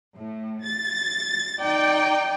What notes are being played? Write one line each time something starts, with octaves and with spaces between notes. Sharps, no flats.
A2
A6
D#4 D5 G5